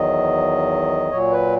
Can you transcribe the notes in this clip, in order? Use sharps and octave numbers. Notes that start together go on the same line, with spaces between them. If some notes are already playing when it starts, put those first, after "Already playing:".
Already playing: E2 D#3 F#3 D#5
A#2 F#3 C#5
B4